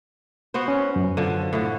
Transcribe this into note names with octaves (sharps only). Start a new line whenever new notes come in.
B3 F#4 C5
C#4
F#2
D3 F3
A2 D3